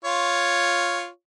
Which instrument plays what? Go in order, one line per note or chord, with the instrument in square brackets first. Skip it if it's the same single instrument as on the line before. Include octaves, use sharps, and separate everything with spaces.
[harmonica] F4 C#5